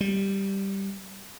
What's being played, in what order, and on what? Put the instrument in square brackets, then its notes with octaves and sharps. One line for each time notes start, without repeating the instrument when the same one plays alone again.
[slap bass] G3